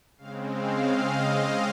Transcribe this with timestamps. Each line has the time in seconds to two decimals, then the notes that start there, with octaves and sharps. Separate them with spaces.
0.18 C#3 G#3 C4 F5
0.51 F5
0.83 D#5